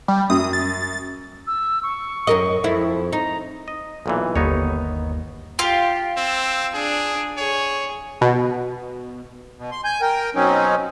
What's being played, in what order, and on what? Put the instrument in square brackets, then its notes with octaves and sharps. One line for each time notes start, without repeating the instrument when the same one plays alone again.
[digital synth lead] G3
[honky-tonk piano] F#2 [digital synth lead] D#6
[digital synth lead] A6
[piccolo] E6
C#6
[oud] F#2 A#4 D#5
F2 E4
[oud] D#4 [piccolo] A#5
[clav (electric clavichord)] D#5
B1 A#2 E3
[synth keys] G1 D#2 [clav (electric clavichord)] B3 D#4 C#5
[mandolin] F4 [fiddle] G4
[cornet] C4 [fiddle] E6
[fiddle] D4 [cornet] G#4
[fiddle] G#4 [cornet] C#5
[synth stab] B2
[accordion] B2
C6
G#5 G6
A#4 G5
B2 F#3 C4 C#4 D#4